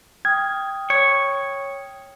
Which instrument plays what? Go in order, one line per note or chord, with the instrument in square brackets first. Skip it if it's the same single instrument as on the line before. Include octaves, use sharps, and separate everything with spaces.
[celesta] G5 D#6 F6 [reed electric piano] G#6
[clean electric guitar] C#5